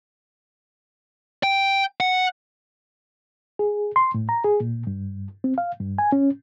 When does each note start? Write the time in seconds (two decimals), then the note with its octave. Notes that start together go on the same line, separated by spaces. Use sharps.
1.43 G5
2.00 F#5
3.59 G#4
3.96 C6
4.14 A2
4.29 A#5
4.44 G#4
4.60 A#2
4.87 G2
5.44 C4
5.58 F5
5.80 G2
5.98 G#5
6.12 C#4